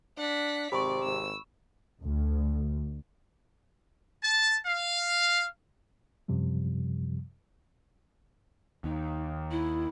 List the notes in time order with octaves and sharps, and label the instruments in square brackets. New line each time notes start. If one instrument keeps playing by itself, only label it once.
[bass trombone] D4 [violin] F#5 B6
[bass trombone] G#1 [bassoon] C3 [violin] D5 [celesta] B5 C#6
[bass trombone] G#1 [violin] E6
[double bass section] D2
[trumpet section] A5
F5
[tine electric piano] F#2 C3 F3 G3
[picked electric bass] D#2 [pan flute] D#4
[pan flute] E4